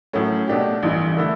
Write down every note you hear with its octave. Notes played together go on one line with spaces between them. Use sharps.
A2 F#3 A3 C#4
B2 A3 D4 G4
A1 G2 E3
D3 A3 E4